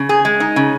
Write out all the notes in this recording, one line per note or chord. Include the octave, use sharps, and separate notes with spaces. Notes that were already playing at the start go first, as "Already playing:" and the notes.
Already playing: C#3
G#4
G#3
D#4
C#3